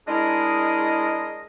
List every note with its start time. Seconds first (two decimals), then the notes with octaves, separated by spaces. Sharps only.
0.07 G#3 D4 E4 G#4 A#4 D#5